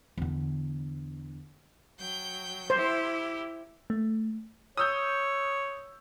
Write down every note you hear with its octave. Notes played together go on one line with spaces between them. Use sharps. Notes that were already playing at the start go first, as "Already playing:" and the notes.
E2 D3
F#3 G5 G6
E4 G4 C5
A3
C#5 D#6 E6 G6